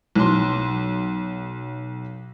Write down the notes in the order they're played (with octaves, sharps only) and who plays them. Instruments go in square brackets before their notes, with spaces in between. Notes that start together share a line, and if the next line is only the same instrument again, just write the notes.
[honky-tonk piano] B1 C6